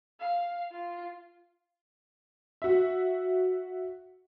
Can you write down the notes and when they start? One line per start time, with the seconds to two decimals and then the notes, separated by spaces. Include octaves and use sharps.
0.20 F5
0.72 F4
2.62 F#4 E5